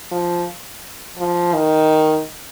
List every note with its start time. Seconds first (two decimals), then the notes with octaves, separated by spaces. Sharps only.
0.11 F3
1.18 F3
1.54 D#3